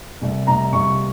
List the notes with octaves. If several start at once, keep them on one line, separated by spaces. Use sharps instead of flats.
C2
C2 A#5
C2 C#6